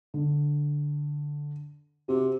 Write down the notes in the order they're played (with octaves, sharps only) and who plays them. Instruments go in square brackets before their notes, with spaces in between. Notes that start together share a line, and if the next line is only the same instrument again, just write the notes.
[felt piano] D3
[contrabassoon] C3 [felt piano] F#4